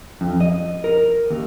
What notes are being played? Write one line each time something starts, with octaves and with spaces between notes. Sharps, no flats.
F2
D#5
A#4
D#2